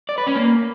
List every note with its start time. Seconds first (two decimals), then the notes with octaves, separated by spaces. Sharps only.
0.09 D5
0.18 B4
0.27 C#4
0.36 A#3